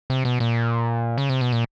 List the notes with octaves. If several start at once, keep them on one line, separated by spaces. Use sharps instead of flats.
C3
B2
A#2
C#3
C3
B2
A#2